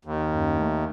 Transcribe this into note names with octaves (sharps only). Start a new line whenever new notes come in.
D#2
F#2
A3